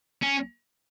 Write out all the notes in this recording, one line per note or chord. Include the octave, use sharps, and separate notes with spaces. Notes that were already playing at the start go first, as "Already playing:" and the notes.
C#4